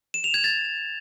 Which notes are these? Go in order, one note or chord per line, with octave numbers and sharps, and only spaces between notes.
E7
F7
G#6
A6